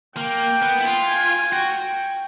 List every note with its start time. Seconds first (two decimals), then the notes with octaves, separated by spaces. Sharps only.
0.17 A#3 G5
0.62 B3
0.80 E4
0.85 F4
1.07 G#5
1.52 F#4 G5